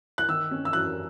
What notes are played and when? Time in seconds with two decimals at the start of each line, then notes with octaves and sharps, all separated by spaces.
0.18 F#6
0.28 D#3 E6
0.51 C#4
0.65 E6
0.73 F#2 F#6